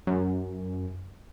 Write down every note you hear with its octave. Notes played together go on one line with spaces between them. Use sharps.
F#2